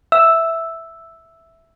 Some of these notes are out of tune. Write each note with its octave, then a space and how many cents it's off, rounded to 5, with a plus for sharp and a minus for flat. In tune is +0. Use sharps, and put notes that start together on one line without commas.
E5 +0 E6 +0